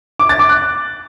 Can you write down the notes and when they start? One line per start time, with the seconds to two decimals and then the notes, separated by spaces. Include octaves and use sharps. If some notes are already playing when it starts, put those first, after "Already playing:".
0.20 D6
0.29 A6
0.39 D6
0.49 F#6